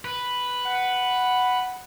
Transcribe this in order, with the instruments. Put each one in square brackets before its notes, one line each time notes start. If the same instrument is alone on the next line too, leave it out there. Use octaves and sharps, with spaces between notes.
[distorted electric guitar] B4
[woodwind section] F#5